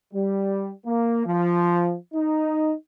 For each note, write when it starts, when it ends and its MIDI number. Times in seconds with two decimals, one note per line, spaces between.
0.14 0.71 55
0.86 1.23 58
1.26 1.97 53
2.14 2.73 63